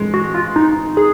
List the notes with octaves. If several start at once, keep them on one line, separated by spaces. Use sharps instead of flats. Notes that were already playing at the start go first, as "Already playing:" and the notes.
Already playing: G#3
F#4
F4
D#4
G#4